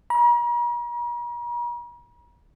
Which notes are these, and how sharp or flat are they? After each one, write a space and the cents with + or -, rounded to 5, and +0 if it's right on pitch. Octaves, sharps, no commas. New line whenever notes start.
A#5 +45